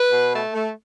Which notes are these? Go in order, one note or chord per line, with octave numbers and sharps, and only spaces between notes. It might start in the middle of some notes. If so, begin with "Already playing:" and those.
Already playing: B4
B2
A3
A3